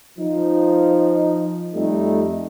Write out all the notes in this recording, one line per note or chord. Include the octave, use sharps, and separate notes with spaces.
F3 D#4
F2 G3 A3 D#4